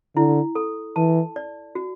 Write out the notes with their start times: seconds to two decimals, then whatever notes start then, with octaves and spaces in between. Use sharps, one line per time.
0.16 D3 E4
0.55 A4
0.96 E3 A5
1.36 D5
1.75 F#4